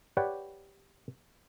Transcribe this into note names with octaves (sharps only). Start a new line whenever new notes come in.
G4 B4 C#5 D5 F#5 G5